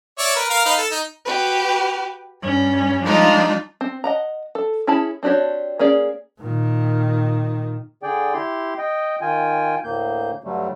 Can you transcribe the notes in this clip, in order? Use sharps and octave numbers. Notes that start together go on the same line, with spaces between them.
C#5 D5 E5
A#4 B4
A#4 F5
D#4 B4 F5
A4
D#4
F#4 G4 B4
G2 C#4
F3 G3 G#3 D4 D#4 F4
C4
D#5 F#5 A#5
A4
C#4 E4 G#4 A5 B5
C4 D4 F#4 G4 C#5
A#3 C#4 G#4 D5
A#2 D#3
D3 G#4 D5 G5
E4 G4 C6
D#5 G5
D#3 F4 G5 G#5
D2 A2 A#3 G6
G2 D3 F#3 G3 A3